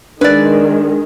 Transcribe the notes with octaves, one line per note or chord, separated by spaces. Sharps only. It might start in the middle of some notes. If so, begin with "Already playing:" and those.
D#3 G#3 D4 B4 D5